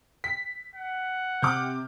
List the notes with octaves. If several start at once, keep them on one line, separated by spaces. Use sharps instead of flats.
B6
F#5
C3 D6 F6 G6